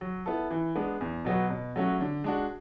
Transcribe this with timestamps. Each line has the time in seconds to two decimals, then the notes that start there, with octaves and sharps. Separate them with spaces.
0.01 F#3
0.26 B3 E4 A4
0.51 E3
0.76 G#3 B3 D4
1.01 E2
1.25 B2 F#3 B3 F#4
1.50 B2
1.76 F#3 A3 C#4 F#4
2.01 D3
2.24 G#3 D4 F#4